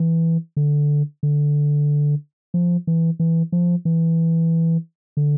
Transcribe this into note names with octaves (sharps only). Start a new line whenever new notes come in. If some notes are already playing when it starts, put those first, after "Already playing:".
Already playing: E3
D3
D3
F3
E3
E3
F3
E3
D3